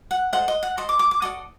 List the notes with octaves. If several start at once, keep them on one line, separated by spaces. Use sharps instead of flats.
F#5
A4 C5 D#5 F#5
D#5
F#5
A4 C5 D#5 D#6
D6
D6
D6
F#4 A4 D5 D#6